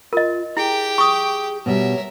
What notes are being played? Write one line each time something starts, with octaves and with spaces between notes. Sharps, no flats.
F4 A#4 D#5
E4 G4 G#4 G5
C#6 D#6
B2 G3 A#4 C#5 E5